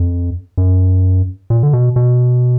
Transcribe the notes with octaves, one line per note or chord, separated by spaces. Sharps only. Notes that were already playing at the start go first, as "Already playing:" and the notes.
Already playing: F2
F#2
A#2
D3
B2
B2